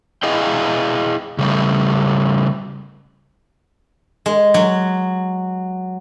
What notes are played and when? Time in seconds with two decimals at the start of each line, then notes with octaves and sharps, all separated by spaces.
0.23 E4 G#4 D#5 F5 G5
1.39 C#3 G3 A3
4.26 G#3
4.54 F#3